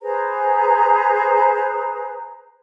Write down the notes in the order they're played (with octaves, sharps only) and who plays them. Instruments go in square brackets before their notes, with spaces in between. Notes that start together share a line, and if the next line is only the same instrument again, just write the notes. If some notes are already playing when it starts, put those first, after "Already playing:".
[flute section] G#4 B4 C5 A#5